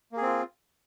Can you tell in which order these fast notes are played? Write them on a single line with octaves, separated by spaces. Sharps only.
A#3 G#4 C4 F4